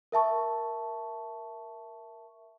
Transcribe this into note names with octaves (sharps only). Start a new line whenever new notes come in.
A#4 E5 A5 C#6